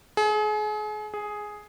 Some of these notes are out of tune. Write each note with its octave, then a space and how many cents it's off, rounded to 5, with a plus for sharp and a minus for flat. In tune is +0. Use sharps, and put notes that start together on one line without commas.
G#4 +35
G#4 +5